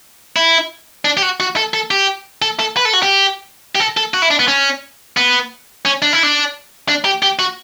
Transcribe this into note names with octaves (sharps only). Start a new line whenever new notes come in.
E4
D4
G4
F#4
F#4
A4
A4
G4
A4
A4
B4
A4
F#4
G4
G4
A4
A4
F#4
E4
D4
B3
C#4
B3
C#4
D4
E4
D4
D4
G4
G4
F#4